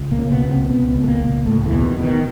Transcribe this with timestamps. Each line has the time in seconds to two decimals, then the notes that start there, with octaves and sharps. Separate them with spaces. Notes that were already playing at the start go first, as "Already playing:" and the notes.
Already playing: C#2
0.11 A#2 A#3
0.18 C#3
0.31 B2 B3
0.44 C#2
0.50 C3 C4
0.69 C#2 B2 B3
0.95 C#2
1.03 A3
1.07 A#2 A#3
1.21 C#2
1.46 C#2 A2 A3
1.66 E2 E3
1.72 B2
1.85 D#3
1.98 B2 D3
2.04 D#3